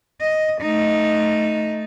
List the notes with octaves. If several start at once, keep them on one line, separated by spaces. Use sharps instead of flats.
D#5
A3 D#4